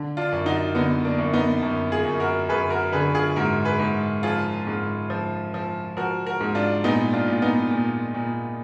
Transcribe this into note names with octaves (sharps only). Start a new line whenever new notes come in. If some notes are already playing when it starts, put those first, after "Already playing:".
Already playing: D3
D4 F4
F#2
D#4 F#4
D3 B3 D#4
A#3 D4
F#2
B3 D#4
F#2
F4 G#4
F#2
F#4 A#4
F#2 G#4 B4
F#4 A#4
D3 G#4 B4
F4 G#4
G#2 F#4 A#4
G#4 B4
G#2
F3 F4 G#4
G#2
F3
F3
F3 F#4 A#4
F#4 A#4
G#2
D4 F4
A#2 B3 D#4
D4 F4
A#2
F4
B3 D#4
A#2
A#2